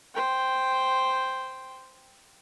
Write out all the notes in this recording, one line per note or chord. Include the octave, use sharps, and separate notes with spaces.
C5 G5